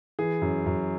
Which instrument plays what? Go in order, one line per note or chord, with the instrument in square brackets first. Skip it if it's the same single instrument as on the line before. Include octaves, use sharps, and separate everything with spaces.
[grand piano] E3 G#4
F#2
F#2